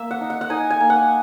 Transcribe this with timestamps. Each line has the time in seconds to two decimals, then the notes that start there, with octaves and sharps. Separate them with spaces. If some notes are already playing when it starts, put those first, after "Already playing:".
Already playing: A#3 E5
0.11 F#5
0.21 D#4
0.30 F#5
0.41 F#5
0.50 D#4 G#5
0.70 G#5
0.81 A#3
0.90 F#5